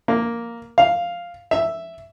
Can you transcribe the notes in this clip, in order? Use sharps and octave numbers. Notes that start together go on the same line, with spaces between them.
A#3
F5
E5